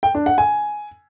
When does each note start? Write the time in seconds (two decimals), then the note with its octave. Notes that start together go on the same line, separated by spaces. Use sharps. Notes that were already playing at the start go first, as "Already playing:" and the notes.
0.03 G5
0.15 D4
0.26 F#5
0.38 G#5